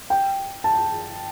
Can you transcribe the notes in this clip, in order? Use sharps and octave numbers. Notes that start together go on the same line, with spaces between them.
G5
A5